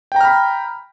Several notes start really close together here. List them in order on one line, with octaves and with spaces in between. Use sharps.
G5 A#5 F6 B5